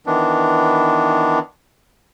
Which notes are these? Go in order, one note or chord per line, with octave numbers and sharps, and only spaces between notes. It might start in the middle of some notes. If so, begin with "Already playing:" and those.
D#3 E3 B3 D4